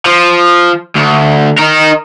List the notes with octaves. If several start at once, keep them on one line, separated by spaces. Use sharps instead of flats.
F3
D2
D#4 A#4